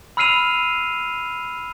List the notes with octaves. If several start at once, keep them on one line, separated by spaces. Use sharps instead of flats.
B5 E6 F6 C7 D#7 F7